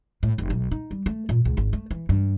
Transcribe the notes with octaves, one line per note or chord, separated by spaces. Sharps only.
A2
F1
B1
D#4
G3
A3
A#2
C#2
G#1
A3
E3
G2